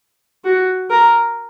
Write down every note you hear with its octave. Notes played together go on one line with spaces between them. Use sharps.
F#4
A#4